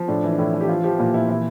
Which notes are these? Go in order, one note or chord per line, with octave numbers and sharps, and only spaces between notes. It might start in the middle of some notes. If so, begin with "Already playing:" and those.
Already playing: F3
A2 D4
E3
D4
A2 E4
E3
G4
F3 F4
F3 G4
A#2 F4
A#2 E4
E3 E4